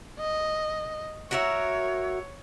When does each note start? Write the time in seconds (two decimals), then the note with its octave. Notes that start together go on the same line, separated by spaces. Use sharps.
0.19 D#5
1.31 F#4 A#4 C#5 E5